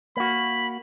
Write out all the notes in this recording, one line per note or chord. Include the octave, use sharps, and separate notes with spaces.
A#3 F#4 B5